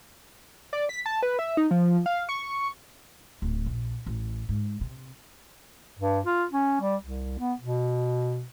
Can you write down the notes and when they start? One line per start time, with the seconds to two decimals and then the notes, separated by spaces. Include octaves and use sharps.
0.73 D5
0.89 B6
1.06 A5
1.23 B4
1.39 E5
1.57 D#4
1.71 F3
2.06 F5
2.29 C#6
3.42 D1
3.66 A#1
4.06 A1
4.49 G#2
4.81 C3
5.99 G2
6.26 F4
6.51 C#4
6.81 G3
7.02 C2
7.39 B3
7.59 B2